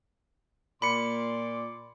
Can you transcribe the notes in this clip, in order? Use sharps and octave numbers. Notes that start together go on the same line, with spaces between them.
A#2 D5 B5 C6 C#7